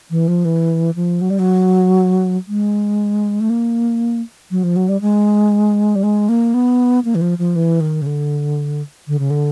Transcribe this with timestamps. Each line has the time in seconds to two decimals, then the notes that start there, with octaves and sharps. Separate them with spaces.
0.11 E3
0.28 F3
0.45 E3
0.96 F3
1.21 F#3
1.30 G3
1.39 F#3
2.48 G#3
3.41 A3
3.50 A#3
4.51 F#3
4.63 F3
4.76 F#3
4.89 G3
5.01 G#3
5.96 G3
6.03 G#3
6.29 A#3
6.54 B3
7.05 A#3
7.15 E3
7.22 F3
7.38 F3
7.56 E3
7.81 D#3
8.02 C#3
8.06 D3
9.08 D3
9.19 C#3
9.30 D3